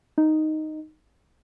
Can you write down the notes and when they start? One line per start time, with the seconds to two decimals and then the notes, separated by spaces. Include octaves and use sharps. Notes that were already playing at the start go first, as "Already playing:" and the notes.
0.18 D#4